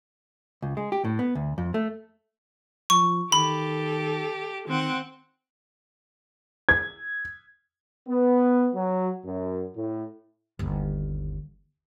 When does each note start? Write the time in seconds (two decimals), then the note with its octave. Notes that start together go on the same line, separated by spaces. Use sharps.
0.62 C#2
0.77 G#3
0.92 G4
1.05 A2
1.19 B3
1.35 D2
1.58 F2
1.74 A3
2.90 F3 C#6
3.32 D#3 G4 A4 B5
4.68 D#3 C4 F#5
6.69 G#6
8.08 B3
8.74 F#3
9.25 F#2
9.76 A2
10.59 G1 D#2